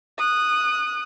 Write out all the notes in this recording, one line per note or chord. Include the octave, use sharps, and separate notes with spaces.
D#6 F#6